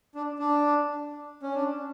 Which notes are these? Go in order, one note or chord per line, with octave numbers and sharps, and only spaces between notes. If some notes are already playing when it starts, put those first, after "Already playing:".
D4
D4
C#4
D4